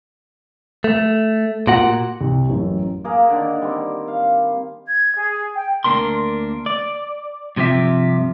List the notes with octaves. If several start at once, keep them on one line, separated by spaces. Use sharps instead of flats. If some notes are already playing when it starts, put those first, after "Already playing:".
A3
A#2 F#4 F#5
C2
A1 F#2
A#3 G#4 A#4
D3 D#3
G3 C4
F5
G#6
G#4
G5
D2 G#2 A#3 D4 A#4 C6
D5
G2 C3 F3 G4 E5